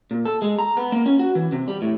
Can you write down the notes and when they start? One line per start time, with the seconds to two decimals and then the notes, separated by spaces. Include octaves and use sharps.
0.11 A#2
0.25 A4
0.42 G#3
0.59 A#5
0.77 B3
0.92 A#3
1.06 C#4
1.19 F#4
1.35 E3
1.52 C3
1.68 G3
1.82 A2